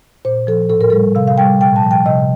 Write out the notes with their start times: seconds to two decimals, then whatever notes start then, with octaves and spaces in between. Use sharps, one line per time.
0.25 A#2 C5
0.47 F3 A4
0.70 A2 A4
0.81 A#4
0.90 G3 A4
1.15 C3 F5
1.27 F5
1.38 G3 G5
1.61 A#2 G5
1.76 A5
1.83 F3
1.91 G5
2.06 C3 D#5